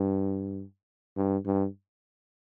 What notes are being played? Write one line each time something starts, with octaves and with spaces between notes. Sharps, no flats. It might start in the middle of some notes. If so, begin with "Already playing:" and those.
Already playing: G2
G2
G2